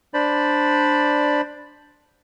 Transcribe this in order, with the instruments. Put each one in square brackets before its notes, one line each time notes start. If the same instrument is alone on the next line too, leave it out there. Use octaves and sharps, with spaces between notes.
[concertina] D4 C5 D5 B5